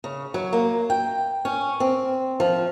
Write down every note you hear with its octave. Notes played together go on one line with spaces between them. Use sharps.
C#3
F#3
A#3
G5
C#4
C4
F3